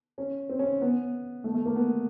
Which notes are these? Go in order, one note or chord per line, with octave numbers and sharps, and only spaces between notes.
C#4
C4
C#4
B3
A3
A3
A#3
B3